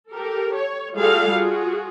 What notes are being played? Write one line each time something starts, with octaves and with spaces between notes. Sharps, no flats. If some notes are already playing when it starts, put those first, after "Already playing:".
G4 A4 A#4
C#5
G3 F4 F#4 G#4 A4 F5
F4 F#4 G#4